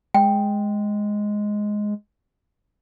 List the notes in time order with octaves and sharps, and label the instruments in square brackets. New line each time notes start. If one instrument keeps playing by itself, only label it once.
[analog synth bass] G#3 [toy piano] G5